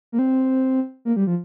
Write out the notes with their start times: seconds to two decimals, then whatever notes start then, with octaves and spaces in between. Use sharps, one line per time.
0.12 A#3
0.19 C4
1.05 A#3
1.16 G3
1.27 F3